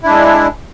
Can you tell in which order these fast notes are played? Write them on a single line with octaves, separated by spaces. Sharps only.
E4 D4 G#3